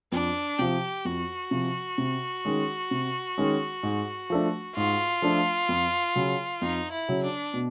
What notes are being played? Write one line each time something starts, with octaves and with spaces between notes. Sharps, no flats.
F2 D4
C3 F3 G4
F2 F#4
C3 F3
C3
D#3 G#3 C#4
C3
D#3 G#3 C#4
G#2
F3 A3 D4
G#2 F4
F3 A3 D4
F2
C#3 F#3
F2 D#4
E4
C#3 F#3
D4
B2